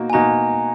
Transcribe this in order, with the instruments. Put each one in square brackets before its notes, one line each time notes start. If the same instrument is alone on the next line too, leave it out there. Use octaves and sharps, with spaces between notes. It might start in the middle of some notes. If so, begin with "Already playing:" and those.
Already playing: [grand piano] B2 A#3 D#4 F#4
[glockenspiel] G#5
[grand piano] B2 A#3 D#4 F#4 [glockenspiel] A#5